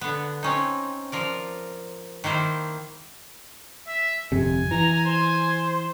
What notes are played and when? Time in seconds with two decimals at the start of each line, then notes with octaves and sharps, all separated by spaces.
0.01 D3 B3
0.43 C4 C#4 D#4
1.12 F3 A#4 D5
2.24 D#3 A#3 E4 C5
3.88 E5
4.32 G1 F2 C3 G#5
4.71 E3 A#5
5.05 C5